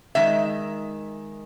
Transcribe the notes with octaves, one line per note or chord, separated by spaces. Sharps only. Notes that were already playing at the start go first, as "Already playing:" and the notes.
D#3 G#3 E5